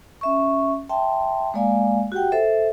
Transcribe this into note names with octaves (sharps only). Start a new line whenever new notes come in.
C#4 E5 C#6
E5 G5 A5 C6
G#3 A#3 D5 F5 G#5
F#4 G4 F#5 G5
A4 C5 E5